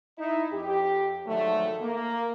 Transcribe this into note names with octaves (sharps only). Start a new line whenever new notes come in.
D#4 E4
F2 G4
G#2 D3 D#3 F3 F#3 A3
A#3